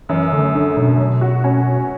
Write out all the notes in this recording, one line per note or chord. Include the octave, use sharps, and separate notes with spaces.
F#2 E3
D3 A3
D3
F#2 B2
F#3
F#4
C#4